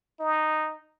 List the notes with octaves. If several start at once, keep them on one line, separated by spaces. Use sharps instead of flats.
D#4